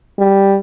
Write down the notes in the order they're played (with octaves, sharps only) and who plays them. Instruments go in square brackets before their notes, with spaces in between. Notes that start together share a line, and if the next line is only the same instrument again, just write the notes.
[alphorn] G3